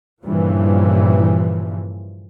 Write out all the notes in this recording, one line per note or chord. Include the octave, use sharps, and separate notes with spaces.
G2 A#2 C#3 E3 F3